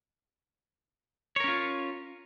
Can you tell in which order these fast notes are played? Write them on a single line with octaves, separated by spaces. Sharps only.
C#5 A#4 C#4 F4